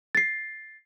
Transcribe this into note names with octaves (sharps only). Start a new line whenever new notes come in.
A6 C7